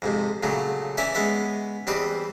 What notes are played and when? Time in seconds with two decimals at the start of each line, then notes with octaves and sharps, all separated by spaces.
0.02 F2 G#2 C3
0.43 A#2 C#3 F#3 A3
0.97 E3 C#4 E4 D5 E5
1.15 G#3 B3 C#4 E5
1.87 E2 G3 C4 B4 D#5